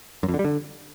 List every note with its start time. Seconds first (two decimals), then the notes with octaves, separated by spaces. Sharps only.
0.23 F#2
0.28 F2
0.34 D3
0.39 G3
0.45 D3